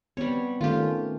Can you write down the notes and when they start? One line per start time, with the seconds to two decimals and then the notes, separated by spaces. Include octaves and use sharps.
0.17 G3 B3 C4 C#5
0.61 D#3 A3 C#4 F4 G4